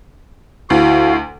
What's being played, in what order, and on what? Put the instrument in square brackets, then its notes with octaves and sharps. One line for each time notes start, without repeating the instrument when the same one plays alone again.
[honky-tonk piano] D2 [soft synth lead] E4 [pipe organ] F#4 F5